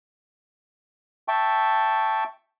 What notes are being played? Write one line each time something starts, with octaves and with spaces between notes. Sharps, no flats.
E5 G5 A5 C#6